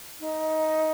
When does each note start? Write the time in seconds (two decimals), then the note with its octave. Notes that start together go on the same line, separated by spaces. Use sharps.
0.20 D#4